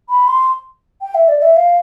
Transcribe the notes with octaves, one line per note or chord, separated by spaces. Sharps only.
B5
C6
G5
E5
D5
D5
E5
F5